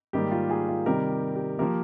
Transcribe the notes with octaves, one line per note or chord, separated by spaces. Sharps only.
G#2 D#3 G3 A#3 G4
F4
F4 G#4
F4
C3 D#3 G3 G4 A#4
G4
F3 A#3 G4 A#4